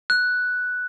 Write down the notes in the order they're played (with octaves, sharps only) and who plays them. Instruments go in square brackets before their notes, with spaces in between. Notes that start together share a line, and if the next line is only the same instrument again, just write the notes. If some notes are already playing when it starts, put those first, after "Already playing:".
[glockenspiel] F#6